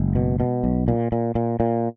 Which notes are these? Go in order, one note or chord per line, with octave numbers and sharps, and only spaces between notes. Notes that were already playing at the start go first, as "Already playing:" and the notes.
Already playing: F#1 G#3
B2
B2
B1
A#2
A#2
A#2
A#2